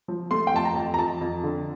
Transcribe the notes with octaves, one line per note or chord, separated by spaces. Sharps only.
F3
A3 C6
G5
F2 A5
A#5
F2
A#5
F2 A5
F2
D3